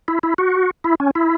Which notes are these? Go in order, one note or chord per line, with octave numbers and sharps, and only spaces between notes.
E4
E4
F#4
E4
C#4
E4